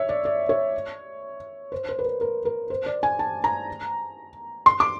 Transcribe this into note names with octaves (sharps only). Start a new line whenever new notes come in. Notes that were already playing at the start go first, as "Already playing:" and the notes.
Already playing: C#5 E5
D5
D5
C#5
C5
C5
B4
A#4
A#4
A#4
C5
D5
G#5
A5
A#5
C6
D6